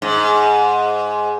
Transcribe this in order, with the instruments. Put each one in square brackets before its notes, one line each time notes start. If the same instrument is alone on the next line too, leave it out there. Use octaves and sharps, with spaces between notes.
[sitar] G#2